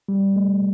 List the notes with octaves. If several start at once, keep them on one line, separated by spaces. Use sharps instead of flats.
G3
A3